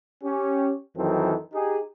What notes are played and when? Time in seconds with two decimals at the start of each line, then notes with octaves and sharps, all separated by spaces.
0.24 C#4 G4
0.96 F2 D#3 E3 F#3 C4 A4
1.53 D#4 G4 G#4